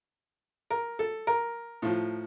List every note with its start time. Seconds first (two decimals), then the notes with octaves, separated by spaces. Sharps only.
0.70 A#4
0.99 A4
1.27 A#4
1.82 A2 F3